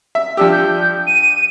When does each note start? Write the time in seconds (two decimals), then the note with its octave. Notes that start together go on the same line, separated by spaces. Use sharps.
0.15 E5
0.37 F3 D4 G4 E6
0.52 G6
1.07 D#7